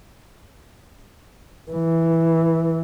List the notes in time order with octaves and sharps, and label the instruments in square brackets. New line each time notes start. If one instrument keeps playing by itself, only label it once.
[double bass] E3